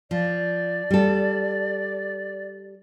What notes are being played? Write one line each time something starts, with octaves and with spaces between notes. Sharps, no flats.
F3 D5
G3 A4